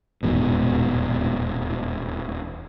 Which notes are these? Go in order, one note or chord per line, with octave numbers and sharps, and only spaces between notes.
D#1 E2 G#2 B2